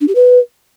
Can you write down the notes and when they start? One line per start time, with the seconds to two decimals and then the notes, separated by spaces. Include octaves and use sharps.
0.01 D4
0.08 G4
0.15 B4